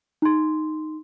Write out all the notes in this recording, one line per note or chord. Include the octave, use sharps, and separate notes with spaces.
D#4 C6